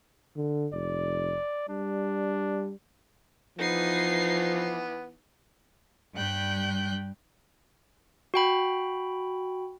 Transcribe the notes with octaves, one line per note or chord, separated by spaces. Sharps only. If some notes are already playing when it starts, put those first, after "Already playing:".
D3
F1 D5
G3 D4
E3 F3 B3 D#4 C7
G2 G3 G5 F#6 G6
F#4 G5 B5